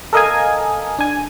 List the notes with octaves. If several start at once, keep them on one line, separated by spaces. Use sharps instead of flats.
A4 A#4 D#5 F5 G#5
D4 G#5